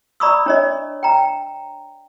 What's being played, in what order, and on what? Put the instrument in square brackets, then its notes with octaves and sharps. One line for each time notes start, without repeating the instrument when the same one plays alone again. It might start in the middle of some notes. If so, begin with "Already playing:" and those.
[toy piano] D5 A#5 B5 C#6 D#6 E6
D4 C#5 D#5
G5 A#5